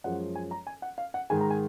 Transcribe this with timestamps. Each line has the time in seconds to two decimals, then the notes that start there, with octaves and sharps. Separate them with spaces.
0.04 F#2 F3 G#3 F#5
0.35 G#5
0.51 A#5
0.67 G#5
0.82 F#5
0.98 F5
1.14 F#5
1.30 G#2 D#3 G#3 G#5
1.41 A#5
1.50 G#5